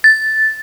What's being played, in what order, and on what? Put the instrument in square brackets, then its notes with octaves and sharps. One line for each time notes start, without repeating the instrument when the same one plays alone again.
[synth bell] A6